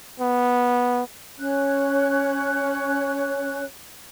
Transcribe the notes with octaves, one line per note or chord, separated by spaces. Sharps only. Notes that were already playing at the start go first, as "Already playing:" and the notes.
B3
C#4 C#5 F#6